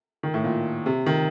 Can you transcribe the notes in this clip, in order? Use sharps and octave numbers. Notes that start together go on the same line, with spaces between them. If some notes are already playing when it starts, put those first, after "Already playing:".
D#3
A2
A#2
C3
D#3